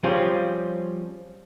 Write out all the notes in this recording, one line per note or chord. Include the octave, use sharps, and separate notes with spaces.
F3 G3 C4 C#4 F4 G#4